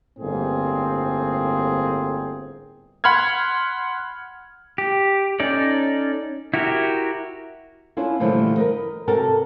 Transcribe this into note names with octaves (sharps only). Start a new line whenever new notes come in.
G1 A2 A#3 C4 G#4
F#5 B5 C6 F6 G#6
G4
C#4 D#4 A4 D5
E4 F#4 G4 A#4
C#4 D4 E4 F4
A#2 D3 E3 F3 G3 A3
A#4 B4 D#5
C3 F#4 A4 A#4 A5